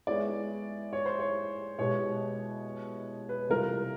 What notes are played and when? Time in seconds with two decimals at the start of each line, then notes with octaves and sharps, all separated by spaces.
0.07 G#3 B3 E4 G#4 C#5 D5
0.93 C#5
1.06 C5
1.19 C#5
1.79 B2 G#3 B3 E4 G4 C#5
3.29 B4
3.49 C3 E3 G3 C4 F4 A#4